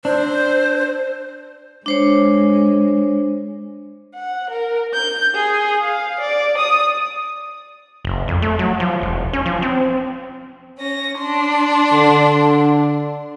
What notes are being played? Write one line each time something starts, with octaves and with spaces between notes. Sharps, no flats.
D4 C5
G#3 D4 C5 C#5
F#5
A#4
G6
G#4
F5
D5
D#6
F#1
F2
A3
F#3
F3
E1
C#4
F3
C4
C#4 A#6
D4 C6
D3